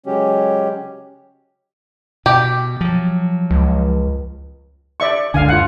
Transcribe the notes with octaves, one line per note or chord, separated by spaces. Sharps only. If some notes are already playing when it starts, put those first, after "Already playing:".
C#3 F#3 G#3 C#4 G4
B2 G4
F3 F#3
C#2
D5 E5 C#6
F#1 C#2 D3 F5 G#5
F4 F#5